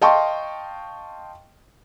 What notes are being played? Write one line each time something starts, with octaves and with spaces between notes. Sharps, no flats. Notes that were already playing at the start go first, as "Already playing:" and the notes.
D#5 F5 G5 A5 C6 C#6